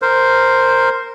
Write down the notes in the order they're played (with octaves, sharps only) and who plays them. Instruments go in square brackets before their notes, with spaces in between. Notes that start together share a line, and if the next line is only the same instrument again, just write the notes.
[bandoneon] A#4 C5